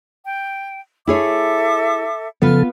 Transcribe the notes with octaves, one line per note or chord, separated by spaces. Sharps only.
G5
E4 G#4 A4 C#5 E5 D6
C#3 F3 B3 F4 A4 B4 F6